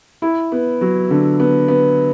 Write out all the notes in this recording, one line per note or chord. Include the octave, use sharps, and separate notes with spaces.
E4
B3
F#3
D3
B3
B3